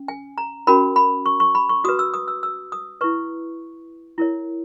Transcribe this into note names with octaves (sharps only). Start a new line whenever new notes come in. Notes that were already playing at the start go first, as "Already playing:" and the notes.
Already playing: C#4
G#5
A#5
C#4 F#4 A#4 B5
B5
C#6
C#6
B5
C#6
F#4 B4 D#6
E6
D#6
E6
E6
D#6
E4 B4 C#6
E4 A#4 C#5